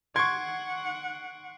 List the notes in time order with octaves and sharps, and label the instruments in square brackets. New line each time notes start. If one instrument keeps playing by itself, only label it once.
[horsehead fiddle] F#5 [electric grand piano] C6 C#6 [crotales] F#6 C7 D7 [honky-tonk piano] G#6